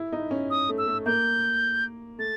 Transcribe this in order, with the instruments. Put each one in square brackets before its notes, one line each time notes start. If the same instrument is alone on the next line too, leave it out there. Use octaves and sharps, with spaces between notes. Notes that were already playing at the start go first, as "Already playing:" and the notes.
Already playing: [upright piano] E4
D#4
C#4
[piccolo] D#6
[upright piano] A3
[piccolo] E6
[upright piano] A3
[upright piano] A#3 [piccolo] G6
[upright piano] A3 [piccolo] A6